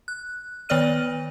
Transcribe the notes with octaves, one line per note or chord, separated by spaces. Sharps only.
F#6
D#3 B3 C#5 D5 F6 D#7